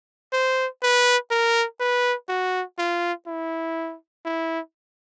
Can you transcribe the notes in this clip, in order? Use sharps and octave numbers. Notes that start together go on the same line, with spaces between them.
C5
B4
A#4
B4
F#4
F4
E4
E4